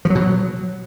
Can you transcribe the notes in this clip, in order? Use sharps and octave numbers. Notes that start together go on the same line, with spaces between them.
F3
F#3
B2
F#3